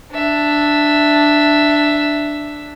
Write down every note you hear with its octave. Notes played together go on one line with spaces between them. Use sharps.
D4 E5